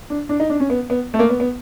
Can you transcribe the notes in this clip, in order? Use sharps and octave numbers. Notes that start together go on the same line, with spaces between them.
D4
D4
D#4
D4
C#4
B3
B3
A3
A#3
B3
B3